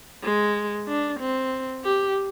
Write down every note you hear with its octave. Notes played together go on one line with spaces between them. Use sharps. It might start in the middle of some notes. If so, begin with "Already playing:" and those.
G#3
D4
C4
G4